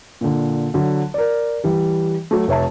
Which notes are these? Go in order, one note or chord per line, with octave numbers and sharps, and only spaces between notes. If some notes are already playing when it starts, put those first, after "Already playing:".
A#2 D3
D3 F#3
A#4 D5
E3 G3
F#3 A3
F1 C#5 E5 A5